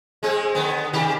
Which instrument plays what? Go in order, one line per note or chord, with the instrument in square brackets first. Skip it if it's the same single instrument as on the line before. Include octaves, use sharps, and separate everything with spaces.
[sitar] G#3 C4 G#4
D3 B3
C3 D#3 G4